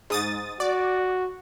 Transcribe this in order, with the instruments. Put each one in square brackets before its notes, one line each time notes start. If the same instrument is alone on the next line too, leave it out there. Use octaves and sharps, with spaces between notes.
[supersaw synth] G#2 D#6 A6
[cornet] F#4 [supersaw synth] D5